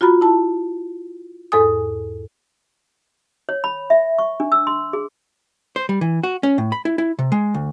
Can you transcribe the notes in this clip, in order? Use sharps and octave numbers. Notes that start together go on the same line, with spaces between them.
F4 F#4 A#5 B5
E4 A5
E2 G#2 A4 G#5 D#6
C#5
B5
E5
C#6
D4
E6
C6
G#4
C5
G3
E3
F#4
C#4
A2
B5
E4
E4
C3
G#3
D2